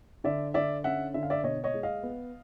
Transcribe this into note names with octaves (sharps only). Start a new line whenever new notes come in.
D3 D5 E5
D3 D5 E5
C#4 E5 F#5
D3 E5
F5
D5 E5
B2 C#5 D#5
C#5 D#5
G#3
D#5 F5
B3